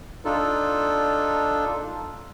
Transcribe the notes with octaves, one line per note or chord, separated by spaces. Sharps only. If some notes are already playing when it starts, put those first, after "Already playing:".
D4 D#4 F4 A4